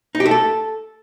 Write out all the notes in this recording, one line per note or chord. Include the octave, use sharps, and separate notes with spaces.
D#4
G4
A3
A4